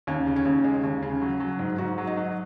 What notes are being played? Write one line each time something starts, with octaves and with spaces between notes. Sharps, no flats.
D#2 C#4
C#3
C#4
D#2
G#3
D#2
C#3
F#3
F#3
G#2
G#2 F#4
F#3
D#4
F#3